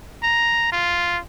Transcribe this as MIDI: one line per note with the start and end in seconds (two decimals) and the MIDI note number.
0.23 0.70 82
0.73 1.18 65